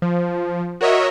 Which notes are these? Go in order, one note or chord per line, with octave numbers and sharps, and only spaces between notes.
F3
F#4 A#4 C#5 D#5 E5